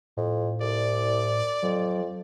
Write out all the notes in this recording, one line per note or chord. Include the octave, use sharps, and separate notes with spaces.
F2 A2
C2 D5
F2 F#3